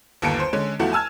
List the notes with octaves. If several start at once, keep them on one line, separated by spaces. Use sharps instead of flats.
G1 D#2 A5 C#7 D7
C5
D3 G#3 C#4
E2 F3 A3 F#4 F#5
G#5 A5 E6 F6 G#6